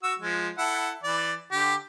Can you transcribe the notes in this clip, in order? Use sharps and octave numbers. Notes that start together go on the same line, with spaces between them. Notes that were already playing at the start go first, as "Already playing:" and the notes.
F#4 E6
F3 G#3
E4 A4 F#5
E3 D5
D3 G4